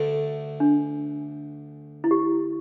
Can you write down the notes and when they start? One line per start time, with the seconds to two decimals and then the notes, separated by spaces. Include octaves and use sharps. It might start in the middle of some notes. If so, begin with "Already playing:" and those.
Already playing: D2 D3 A3
0.60 D4
2.04 E4
2.11 G4